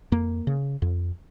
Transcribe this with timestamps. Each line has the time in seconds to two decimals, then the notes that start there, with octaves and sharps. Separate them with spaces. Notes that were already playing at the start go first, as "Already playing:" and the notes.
0.12 F2 A#3
0.47 C#3
0.82 F2